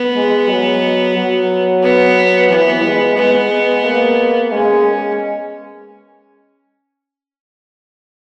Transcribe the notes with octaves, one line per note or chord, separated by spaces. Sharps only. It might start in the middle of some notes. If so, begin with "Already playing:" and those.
Already playing: B3
G#3
F#3
F#3
B3
E3 B3
G#3
G#3 B3
A#3
G#3 C#4